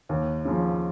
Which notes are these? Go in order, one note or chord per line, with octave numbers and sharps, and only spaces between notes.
D#2
C#3 F3